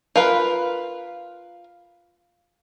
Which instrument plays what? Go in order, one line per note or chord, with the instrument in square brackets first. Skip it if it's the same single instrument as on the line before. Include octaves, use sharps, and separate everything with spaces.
[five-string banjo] F4 A#4 B4